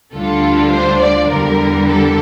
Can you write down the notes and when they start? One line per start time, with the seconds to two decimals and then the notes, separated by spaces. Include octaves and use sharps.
0.14 D2 D3 G3 D4 F4 A4
0.73 C5
1.02 D5
1.31 E2 D3 G3 A#4
1.91 A4